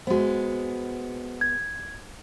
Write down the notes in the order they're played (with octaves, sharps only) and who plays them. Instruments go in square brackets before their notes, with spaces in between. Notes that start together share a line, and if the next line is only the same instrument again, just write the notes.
[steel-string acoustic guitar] G#3 B3 [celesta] F#4 C5
[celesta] G#6